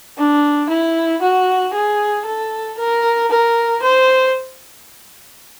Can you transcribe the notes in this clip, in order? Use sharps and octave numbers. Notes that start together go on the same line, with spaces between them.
D4
E4
F#4
G#4
A4
A#4
A#4
C5